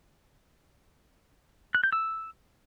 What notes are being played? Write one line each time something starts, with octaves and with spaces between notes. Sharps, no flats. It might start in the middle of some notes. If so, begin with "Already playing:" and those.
F#6
G6
E6